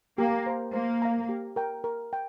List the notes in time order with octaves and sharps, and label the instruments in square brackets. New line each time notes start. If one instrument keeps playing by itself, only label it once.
[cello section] A#3 [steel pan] G4
[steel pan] C5 A#5
[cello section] A#3 [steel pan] C5
[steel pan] F5 A#5
G4
A#4 G5 A#5
A#4
G5